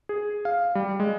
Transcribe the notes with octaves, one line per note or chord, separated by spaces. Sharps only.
G#4
F5
G3
G#3